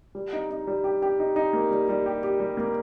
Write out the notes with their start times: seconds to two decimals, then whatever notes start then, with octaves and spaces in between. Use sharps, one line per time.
0.15 G3
0.33 D#4
0.50 D#4
0.67 G3
0.84 G4
1.02 G4
1.19 D#4
1.36 D#4
1.53 A#3
1.71 G3
1.89 G3
2.06 G4
2.23 G4
2.40 G3
2.57 A#3